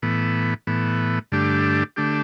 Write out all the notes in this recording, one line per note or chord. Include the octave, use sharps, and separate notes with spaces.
A2 E3 B3
A2 E3 B3
G2 D3 A3 D4 G4
D3 A3 D4 G4